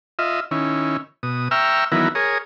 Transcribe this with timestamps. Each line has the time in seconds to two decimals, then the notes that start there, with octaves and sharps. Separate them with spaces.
0.19 F4 D#5 E5
0.51 D#3 C#4 E4
1.23 B2 D#6
1.51 E5 G5 A#5 C#6 E6 F6
1.92 D#3 E3 F#3 B3 E4 A#4
2.15 G#4 A#4 C#5 D#6